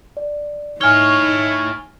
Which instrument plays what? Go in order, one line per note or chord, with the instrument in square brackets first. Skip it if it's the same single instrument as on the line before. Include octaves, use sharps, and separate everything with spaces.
[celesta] D5
[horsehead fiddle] D#4 [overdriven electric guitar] E4 C#5 [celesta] G#5 F6 G7